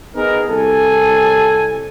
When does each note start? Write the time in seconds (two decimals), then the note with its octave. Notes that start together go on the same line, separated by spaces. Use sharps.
0.16 B3 D#4 G#4 A#4
0.49 C2 A4 G#5